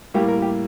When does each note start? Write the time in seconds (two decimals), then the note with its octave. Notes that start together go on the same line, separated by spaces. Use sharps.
0.14 A2 G3 A#3 G4
0.28 A#4
0.42 G4